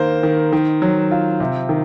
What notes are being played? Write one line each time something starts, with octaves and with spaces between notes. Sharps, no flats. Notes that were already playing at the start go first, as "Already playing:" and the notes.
Already playing: D#3 A#3 C5
D#3
D#3
F#3
F4
C3
D#3